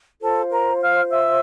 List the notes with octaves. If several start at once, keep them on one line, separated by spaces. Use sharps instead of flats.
F4 A4 C5 A5
A#4 A#5
F5 F6
E5 E6